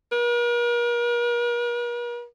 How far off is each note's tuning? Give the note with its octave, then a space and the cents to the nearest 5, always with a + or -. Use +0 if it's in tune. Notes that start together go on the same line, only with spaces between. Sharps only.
A#4 +45